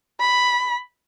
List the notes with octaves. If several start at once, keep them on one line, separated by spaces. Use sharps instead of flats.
B5